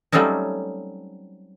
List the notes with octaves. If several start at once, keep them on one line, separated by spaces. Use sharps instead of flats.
F#3 G3 A3 C4 C#4 D#4